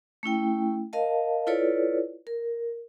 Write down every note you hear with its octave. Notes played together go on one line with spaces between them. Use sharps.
A3 C#4 E4 G5
A#4 D#5 F5 A5
E4 F4 A4 B4 C#5 D5
A#4